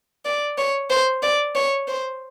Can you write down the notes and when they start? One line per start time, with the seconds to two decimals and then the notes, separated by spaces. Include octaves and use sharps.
0.25 D5
0.58 C#5
0.90 C5
1.22 D5
1.55 C#5
1.88 C5